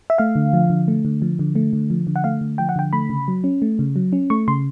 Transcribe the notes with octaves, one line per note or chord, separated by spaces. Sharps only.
E5
A3 F5
D3
F3
D3
A3
D3
F3
D3
A3
D3
F3
D3
F#5
A3 F5
D3
F3 G5
F#5
D3 G5
A3 B5
C#3
F#3
C#4
A3
C#3
F#3
C#4
A3 C#6
C#3 C6